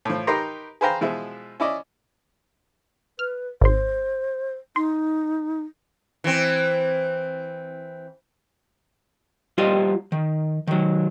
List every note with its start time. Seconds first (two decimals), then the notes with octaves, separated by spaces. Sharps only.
0.05 A2 F3
0.27 D#4 G4 A#4 B4 A#5 C6
0.81 G#4 B4 C5 F5 G5 A#5
1.01 B2 F3 G#3 E4
1.60 C#4 E4 D5 D#5
3.19 B4 F6
3.61 G#1 C5 C6
4.76 D#4 C6
6.24 E3 C4
9.58 G3 F4 G4 C5 D5 D#5
10.12 D#3
10.67 D#3 F#3